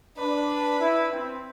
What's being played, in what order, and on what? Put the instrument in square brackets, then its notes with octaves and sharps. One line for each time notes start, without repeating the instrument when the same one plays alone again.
[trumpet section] D4 [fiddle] B4
[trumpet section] E4
C4